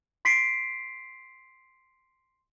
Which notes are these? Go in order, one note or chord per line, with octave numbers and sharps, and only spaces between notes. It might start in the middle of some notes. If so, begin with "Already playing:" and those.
C6 B6 C7 D7